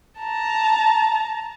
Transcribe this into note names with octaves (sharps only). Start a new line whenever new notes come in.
A5 A#5